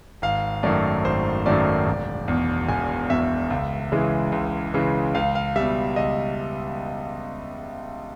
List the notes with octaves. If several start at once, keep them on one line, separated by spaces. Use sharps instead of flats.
G#1 F5
F#2 D#3 F#3 A3 D5
G#1 C5
F#2 D#3 F#3 A3 D5
E1
E2 B2
E1 G#5
E2 B2 E5
C#2
C#3 E3 G#3
C#2
C#3 E3 G#3
C#2 F5
F5
B2 G3 E5
C#2 D#5